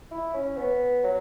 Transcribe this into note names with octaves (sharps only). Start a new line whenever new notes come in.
E4
C#4
B3
F#3